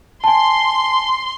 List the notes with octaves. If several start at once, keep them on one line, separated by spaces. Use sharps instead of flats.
G#5 A5 C6